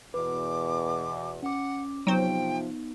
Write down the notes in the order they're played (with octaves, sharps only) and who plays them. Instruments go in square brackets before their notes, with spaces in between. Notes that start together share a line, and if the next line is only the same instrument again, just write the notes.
[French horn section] E2 B2 [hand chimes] B4 [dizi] D6
[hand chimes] C#4 D6 [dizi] F#5
[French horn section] C3 F3 [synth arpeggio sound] F#3 C5 [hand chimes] B3 D#4 [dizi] G5